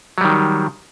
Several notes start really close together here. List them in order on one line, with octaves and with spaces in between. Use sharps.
F#3 G3 D#3